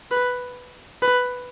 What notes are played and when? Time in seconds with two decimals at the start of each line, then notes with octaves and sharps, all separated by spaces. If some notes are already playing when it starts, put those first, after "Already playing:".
0.11 B4
1.02 B4